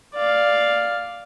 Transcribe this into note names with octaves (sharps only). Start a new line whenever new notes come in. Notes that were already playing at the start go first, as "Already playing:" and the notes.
D5 F5